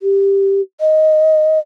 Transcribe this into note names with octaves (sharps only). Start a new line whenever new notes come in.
G4
D#5